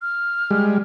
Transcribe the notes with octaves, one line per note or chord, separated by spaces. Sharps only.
F6
G3 G#3